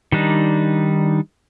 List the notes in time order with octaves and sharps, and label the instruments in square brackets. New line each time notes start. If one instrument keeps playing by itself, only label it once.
[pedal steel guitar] D#3 G3 D4 D#4